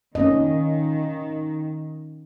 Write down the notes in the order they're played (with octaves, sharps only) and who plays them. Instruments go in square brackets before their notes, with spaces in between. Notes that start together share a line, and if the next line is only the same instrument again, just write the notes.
[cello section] D#3 [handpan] A#3 C#4 D#5